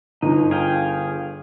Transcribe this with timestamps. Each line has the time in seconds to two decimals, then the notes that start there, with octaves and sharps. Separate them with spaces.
0.22 G1 D#4
0.51 G#4 F5 G5